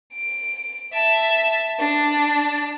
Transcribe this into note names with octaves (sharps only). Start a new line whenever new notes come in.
D7
E5 A5
D4